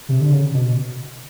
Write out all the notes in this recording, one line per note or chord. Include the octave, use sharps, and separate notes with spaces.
C3
D3
C#3
B2